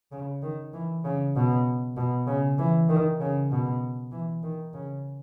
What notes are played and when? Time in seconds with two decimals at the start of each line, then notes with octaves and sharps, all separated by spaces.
0.12 C#3
0.42 D#3
0.73 E3
1.04 C#3
1.35 B2
1.97 B2
2.27 C#3
2.59 E3
2.89 D#3
3.20 C#3
3.51 B2
4.12 E3
4.43 D#3
4.74 C#3